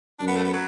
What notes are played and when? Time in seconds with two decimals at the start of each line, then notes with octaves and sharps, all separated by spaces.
0.19 F#2 D4
0.27 B3
0.36 A3
0.45 B3
0.53 F#3